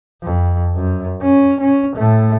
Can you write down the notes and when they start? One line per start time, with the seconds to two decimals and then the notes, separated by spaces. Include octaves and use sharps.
0.23 F2
0.75 F#2
1.22 C#4
1.61 C#4
1.96 A2 A3